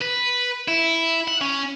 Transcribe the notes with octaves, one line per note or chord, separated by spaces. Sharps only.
B4
E4
F#5
C#4